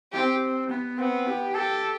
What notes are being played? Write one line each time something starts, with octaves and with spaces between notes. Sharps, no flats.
C4 G4
B3
B3 C4
G4
G4 A4